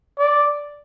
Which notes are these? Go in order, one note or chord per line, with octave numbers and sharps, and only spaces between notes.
D5